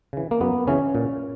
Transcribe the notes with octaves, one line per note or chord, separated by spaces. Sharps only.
C#3 E3
A#3
F#2 B3
C#3 E3 C#4
A#2